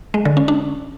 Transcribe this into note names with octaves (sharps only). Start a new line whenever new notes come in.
G#3
D3
C#4
D4